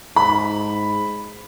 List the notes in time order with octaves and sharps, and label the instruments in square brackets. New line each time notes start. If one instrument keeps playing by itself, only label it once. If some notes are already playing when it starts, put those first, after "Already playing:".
[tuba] G#2 [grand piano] B5